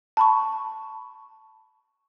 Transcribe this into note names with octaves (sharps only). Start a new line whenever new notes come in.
A5 B5 C#6